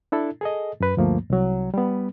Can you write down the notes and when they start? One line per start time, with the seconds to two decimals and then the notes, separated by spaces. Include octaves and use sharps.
0.12 D4 E4 A4
0.41 G#4 A4 D#5
0.80 F#2 B4
0.97 D2 G2 F3 A3 A#3
1.30 C2 F#3
1.74 G3 B3